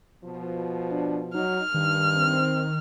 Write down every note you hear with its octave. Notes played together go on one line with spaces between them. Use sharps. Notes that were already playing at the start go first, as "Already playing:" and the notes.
B2 F3
D4
F#3 D#4 F6
G2 D#3
C4